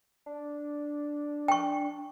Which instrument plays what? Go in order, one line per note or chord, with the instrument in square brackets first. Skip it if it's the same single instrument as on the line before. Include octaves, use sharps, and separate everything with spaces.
[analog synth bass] D4
[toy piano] G5 C#6